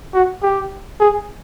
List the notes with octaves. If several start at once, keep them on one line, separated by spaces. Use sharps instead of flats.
F#4
G4
G#4